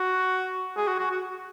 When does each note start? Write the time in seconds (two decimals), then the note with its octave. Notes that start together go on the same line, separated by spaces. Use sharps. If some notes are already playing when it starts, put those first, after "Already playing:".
Already playing: F#4
0.77 G#4
0.88 F#4
1.00 F#4
1.11 F#4